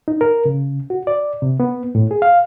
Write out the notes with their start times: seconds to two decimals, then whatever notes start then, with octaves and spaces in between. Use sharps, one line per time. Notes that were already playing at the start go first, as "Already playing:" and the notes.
0.08 D#4
0.21 A#4
0.45 C#3
0.90 F#4
1.07 D5
1.42 C3
1.60 B3
1.95 A2
2.11 G#4
2.22 F5